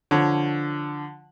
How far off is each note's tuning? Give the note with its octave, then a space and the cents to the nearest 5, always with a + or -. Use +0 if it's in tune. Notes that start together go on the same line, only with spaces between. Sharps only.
D3 +0 F3 +0 C#5 +0